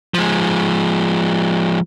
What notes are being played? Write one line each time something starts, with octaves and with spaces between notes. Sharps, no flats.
F3 G#3